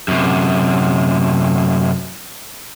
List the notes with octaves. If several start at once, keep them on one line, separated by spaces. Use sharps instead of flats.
F#2 C3